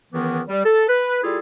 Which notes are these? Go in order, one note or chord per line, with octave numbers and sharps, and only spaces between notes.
C#2 D#3 E3 B3
G3
A4
B4
G3 E4 F4 G#4 A4